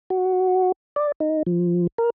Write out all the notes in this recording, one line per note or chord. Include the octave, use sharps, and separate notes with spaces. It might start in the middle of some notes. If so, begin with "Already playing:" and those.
F#4
D5
D#4
F3
A#4